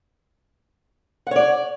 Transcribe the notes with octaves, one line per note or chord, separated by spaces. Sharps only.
C#5 D5 F#5